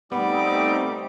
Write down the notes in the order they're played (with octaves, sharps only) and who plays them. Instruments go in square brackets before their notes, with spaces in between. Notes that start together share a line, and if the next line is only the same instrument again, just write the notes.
[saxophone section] G3 [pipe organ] A3 C4 D#4 [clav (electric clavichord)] B3 [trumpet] D6